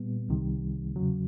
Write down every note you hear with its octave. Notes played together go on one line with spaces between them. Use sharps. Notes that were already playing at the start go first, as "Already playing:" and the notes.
Already playing: A#2 G3 B3
C2 C3 D#3 G3
E2 C#3 F#3